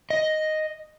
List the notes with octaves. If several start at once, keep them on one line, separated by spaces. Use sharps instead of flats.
D#5